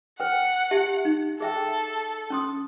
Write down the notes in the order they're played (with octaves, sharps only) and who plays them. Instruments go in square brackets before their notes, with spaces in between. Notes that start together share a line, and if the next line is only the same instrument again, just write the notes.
[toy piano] B4 G5 [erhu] F#5
[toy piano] G4 E5 A5
D#4
[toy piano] G#4 E5 G5 [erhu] A4
[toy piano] C#4 C6 D#6